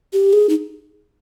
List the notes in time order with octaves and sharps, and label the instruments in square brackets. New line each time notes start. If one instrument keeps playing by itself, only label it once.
[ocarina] G4
G#4
D#4